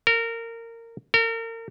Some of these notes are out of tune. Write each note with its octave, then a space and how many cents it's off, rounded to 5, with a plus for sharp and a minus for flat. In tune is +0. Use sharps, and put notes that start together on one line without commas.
A#4 -20
A#4 -35